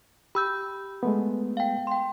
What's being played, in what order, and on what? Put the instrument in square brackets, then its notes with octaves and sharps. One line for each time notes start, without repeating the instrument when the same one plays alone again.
[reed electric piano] G4 [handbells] B5 E6 G6
[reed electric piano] G#3 A3 B3
[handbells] F5 G5
G5 C6